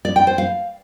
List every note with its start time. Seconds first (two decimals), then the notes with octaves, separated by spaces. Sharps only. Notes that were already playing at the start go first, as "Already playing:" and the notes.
0.05 D5
0.16 G5
0.27 C5
0.38 F5